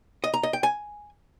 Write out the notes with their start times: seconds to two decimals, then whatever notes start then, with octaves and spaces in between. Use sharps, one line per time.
0.24 D#5
0.34 A#5
0.43 D#5
0.53 G5
0.63 G#5